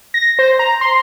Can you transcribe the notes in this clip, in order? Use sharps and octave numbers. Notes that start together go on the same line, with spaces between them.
A#6
C5
A#5
C6